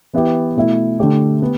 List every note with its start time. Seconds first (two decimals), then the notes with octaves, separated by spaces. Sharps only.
0.13 E3 B3 E4 G4
0.57 B2 A3 E4
0.99 D3 A3 G4
1.41 B3 G4